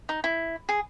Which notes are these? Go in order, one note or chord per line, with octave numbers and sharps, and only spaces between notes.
D#4
E4
G#4